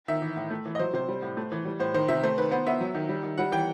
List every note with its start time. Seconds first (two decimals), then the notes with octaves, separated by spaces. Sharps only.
0.08 D#3 E5
0.22 E3
0.36 A2
0.51 A3
0.65 E3
0.75 D#5
0.79 F#3 C5
0.93 C3 C5
1.09 G3
1.22 A2
1.37 A3
1.52 E3
1.65 G3
1.80 A2 C5
1.94 D#3 C5
2.08 C3 E5
2.23 A3 C5
2.38 D#3 B4
2.51 B3 C5
2.67 B3 E5
2.81 F#3
2.95 D#3
3.09 G3
3.23 D#3
3.38 G3 F#5
3.52 E3 G5